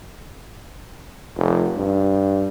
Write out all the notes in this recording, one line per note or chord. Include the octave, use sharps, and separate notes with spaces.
F1
G2